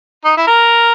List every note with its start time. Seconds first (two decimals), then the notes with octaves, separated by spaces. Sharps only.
0.24 D#4
0.37 E4
0.47 A#4